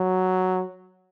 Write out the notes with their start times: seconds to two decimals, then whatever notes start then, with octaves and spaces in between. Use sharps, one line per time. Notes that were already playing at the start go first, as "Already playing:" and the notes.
Already playing: F#3